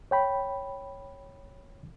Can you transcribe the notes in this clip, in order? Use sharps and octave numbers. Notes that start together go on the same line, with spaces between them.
C#5 G5 B5